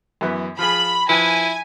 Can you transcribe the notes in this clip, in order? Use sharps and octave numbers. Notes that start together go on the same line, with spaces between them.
F#2 E3 B3
F3 F4 G#4 B5
F3 E4 B4 G#5